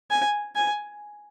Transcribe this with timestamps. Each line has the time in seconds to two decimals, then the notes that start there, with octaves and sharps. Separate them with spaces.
0.11 G#5
0.55 G#5